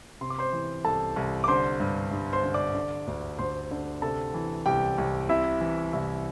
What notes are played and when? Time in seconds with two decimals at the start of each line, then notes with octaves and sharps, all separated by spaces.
0.21 C3 C6
0.30 D6
0.39 C5 C6
0.53 E3
0.85 C2 A4 A5
1.16 C2
1.44 D6
1.48 D3 C5 C6
1.80 G2
2.11 G2
2.33 C5 C6
2.44 D3
2.54 D5 D6
2.75 D3
3.07 D2
3.38 D2 C5 C6
3.71 D3
4.02 C3 A4 A5
4.34 E3
4.66 C2 G4 G5
4.98 C2
5.29 C3 E4 E5
5.61 E3
5.93 C2 E4 E5